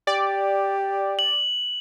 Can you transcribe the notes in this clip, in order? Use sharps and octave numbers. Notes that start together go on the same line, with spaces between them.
G4 D5
F#7